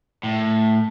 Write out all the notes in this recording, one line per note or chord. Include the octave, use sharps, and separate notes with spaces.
A2